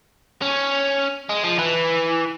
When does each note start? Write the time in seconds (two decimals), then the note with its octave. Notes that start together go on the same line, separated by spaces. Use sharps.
0.42 C#4
1.29 G#3
1.44 F3
1.59 E3